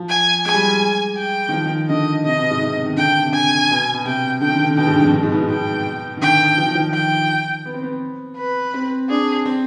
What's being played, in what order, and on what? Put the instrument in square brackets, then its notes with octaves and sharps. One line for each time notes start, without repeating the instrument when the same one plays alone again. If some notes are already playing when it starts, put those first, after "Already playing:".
Already playing: [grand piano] F3
[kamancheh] G#5
[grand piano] G#3 [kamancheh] G#5
[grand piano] G3
G#3
[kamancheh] G5
[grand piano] D#3
F3
D#3
[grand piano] D3 [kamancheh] D#5
[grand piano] C3 [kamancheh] D#5
[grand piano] B2
G#2
C3
D#3
[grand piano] D3 [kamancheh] G5
[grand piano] C3
[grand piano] D3 [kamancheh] G#5
[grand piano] B2
B2
[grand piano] C3 [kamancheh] G5
[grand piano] D3 [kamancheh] G5
[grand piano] D#3
D3
D#3
D3
[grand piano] B2 [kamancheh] G5
[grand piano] G#2
G2
F2
G2
G#2
B2
G#2
[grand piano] B2 [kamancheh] G5
[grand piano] D#3
[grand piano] D3 [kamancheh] G5
[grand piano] F3
D#3
F3
[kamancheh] G5
[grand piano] B3
C4
B3
[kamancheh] B4
[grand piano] C4
[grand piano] D4 [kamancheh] G#4
[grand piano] C4